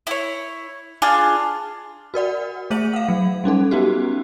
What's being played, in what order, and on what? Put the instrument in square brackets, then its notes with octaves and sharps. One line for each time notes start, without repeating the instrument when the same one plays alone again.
[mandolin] E4 C#5
D4 F4 G#4
[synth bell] F#4 A#4 D5 F#5
A3 G#4 C5 E5 D#7 F#7
F5 F#5
F#3
G3 C#4 D#4 A4
B3 C#4 D#4 F#4 G4